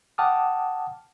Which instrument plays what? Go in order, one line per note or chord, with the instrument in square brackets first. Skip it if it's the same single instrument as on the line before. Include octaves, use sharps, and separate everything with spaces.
[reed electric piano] F#5 G5 A5 D6 D#6 F6